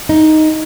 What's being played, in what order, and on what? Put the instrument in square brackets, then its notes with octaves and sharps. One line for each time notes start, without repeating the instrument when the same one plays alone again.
[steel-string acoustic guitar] D#4